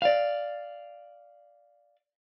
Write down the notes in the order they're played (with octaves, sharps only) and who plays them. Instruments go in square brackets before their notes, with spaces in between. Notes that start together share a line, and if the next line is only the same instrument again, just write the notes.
[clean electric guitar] D5 F5